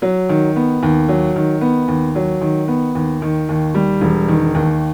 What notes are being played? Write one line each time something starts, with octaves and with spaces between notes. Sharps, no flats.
F#3
D#3
B3
D#2
F#3
D#3
B3
D#2
F#3
D#3
B3
D#2
D#3
D#2
G3
E1
D#3
D#2